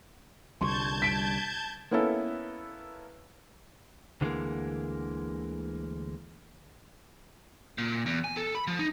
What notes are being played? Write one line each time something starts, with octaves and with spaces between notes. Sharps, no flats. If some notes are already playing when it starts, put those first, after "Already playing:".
C2 D3 G3 A5 C6 C#6 G6 G#6
B6 D7
A#3 B3 C#4 E4 A4 B4
D2 D3 E3 F3 G#3 A#3
A#2
E2
G#5
A4
B5
F3
D#4